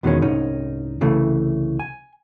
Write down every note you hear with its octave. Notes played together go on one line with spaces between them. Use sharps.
E2 B2 D#3 G3 G#3 C#4
C2 G#2 C#4 D#4
C2 C#3 E3 A3
G#5